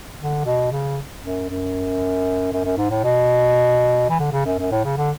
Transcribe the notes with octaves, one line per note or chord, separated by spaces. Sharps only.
D3
B2
C#3
F#2
F#2
F#2
F#2
G#2
A2
B2
E3
D3
C#3
F#2
F#2
A2
C#3
D3